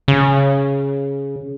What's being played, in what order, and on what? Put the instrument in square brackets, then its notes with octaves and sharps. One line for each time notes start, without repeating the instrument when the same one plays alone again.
[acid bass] C#3